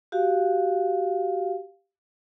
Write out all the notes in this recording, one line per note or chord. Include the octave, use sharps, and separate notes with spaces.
F#4 G4 F5